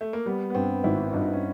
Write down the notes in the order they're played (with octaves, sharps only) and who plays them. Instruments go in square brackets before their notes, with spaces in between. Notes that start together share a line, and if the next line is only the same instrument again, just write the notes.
[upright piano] A3
A#3
[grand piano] G3 [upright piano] B3
[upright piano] B3
[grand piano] G2 [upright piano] C4
[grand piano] G#1 [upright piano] E4
[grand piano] G2 [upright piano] D#4
[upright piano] C#4